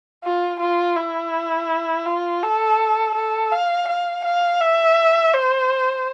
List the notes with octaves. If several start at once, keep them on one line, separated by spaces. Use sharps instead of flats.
F4
F4
E4
F4
A4
A4
F5
F5
F5
E5
C5